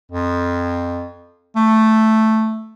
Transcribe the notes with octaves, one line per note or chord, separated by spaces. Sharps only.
F2
A3